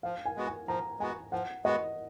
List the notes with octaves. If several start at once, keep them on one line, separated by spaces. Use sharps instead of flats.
F3 F5
G#5
G#3 B3 F#4
G#5
F3 A#5
G#3 B3 F#4 G#5
F3 F#5
G#3 B3 F#4 D#5